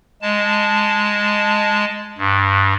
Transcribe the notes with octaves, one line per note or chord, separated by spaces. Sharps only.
G#3 A5
G2